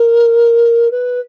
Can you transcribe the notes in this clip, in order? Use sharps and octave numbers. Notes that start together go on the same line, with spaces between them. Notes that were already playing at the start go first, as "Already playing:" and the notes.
Already playing: A#4
B4